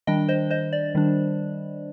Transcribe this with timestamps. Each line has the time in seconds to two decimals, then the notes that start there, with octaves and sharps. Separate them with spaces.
0.07 D#3 G3 D4 D#5 G5
0.29 C5 D#5
0.50 C5 D#5
0.73 D5
0.95 D#3 G3 D4